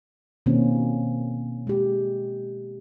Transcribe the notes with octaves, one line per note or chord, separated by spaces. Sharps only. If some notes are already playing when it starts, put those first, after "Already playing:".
B2 D#3 A#3 C4 C#4
G#3 G4